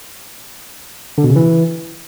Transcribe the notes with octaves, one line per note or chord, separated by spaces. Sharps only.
D3
B2
C#3
E3